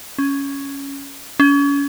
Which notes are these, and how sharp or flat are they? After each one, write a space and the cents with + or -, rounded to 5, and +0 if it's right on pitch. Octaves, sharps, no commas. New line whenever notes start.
C#4 +5
C#4 +35